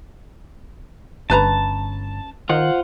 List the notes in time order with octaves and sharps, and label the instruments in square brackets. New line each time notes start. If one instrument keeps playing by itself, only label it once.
[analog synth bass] G1 [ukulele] C#4 B4 A#5 [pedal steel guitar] A5
[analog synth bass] D#3 [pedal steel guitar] F4 C5 F#5